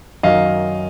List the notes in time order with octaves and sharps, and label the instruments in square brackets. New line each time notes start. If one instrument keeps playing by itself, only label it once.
[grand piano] F#2 D#3 F#3 D#5 F5